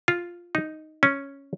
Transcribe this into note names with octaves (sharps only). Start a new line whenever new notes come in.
F4
D#4
C#4